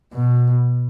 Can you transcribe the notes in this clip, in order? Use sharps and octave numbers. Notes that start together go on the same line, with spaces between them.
B2